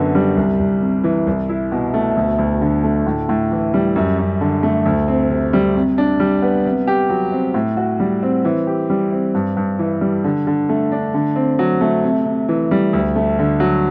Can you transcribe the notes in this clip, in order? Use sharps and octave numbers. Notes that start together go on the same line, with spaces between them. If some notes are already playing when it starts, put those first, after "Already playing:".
Already playing: F#2 D3 B3
G3
C2
C2
C3
E3
C2
E4
B2
A3
D2
D2
D3
A3
A2
A2
E3
G3
F#2
F#2
D3
A3
D2
C4
C3
G3
C3
D4
G3
B3
C3
G4
F#3
C4
A2
F#4
G3
C4
E3
G4
G3
C4
G2
G2
E3
G3
D3
D3
A3
D4
D3
C4
F#3
A3
C3
C3
E3
G3
D2
A3
D3
F#3